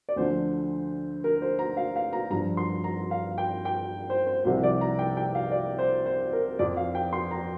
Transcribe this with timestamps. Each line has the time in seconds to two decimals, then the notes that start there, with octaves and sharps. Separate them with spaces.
0.09 D5
0.16 D2 D3 F3 C5
1.24 A#4
1.42 C5
1.59 A#5
1.77 F5
1.96 F5
2.13 A#5
2.30 G2 F3 A#5
2.57 C6
2.84 A#5
3.11 F5
3.38 G5
3.65 G5
4.10 C5
4.27 C5
4.45 C2 C3 F3 C5
4.63 D5
4.81 A#5
4.99 G5
5.17 G5
5.35 F5
5.52 D5
5.78 C5
6.06 C5
6.33 A#4
6.59 F2 F3 D5
6.77 F5
6.95 G5
7.13 C6
7.31 A#5